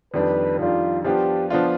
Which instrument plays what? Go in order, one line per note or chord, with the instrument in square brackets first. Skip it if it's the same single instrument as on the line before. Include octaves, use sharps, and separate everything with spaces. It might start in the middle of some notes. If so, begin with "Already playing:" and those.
[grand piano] F2 D#3 G3 D4 [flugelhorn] B4
[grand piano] F2 D#3 G3 D4 [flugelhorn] F4
[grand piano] F3 B3 D4 F4 [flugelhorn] G4
[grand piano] F3 B3 D4 F4